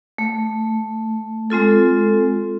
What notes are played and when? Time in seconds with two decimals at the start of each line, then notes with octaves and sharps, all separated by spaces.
0.18 A3
1.50 G#3 C4 F4 A4